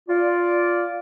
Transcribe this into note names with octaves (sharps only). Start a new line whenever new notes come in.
F4 D5